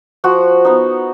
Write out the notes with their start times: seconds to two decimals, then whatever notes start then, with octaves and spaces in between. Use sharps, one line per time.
0.24 F3 F#4
0.65 B3 D#4